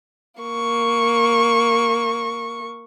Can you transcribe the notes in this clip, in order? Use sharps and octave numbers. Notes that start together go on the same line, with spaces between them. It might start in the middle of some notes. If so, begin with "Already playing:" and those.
A#3 C#6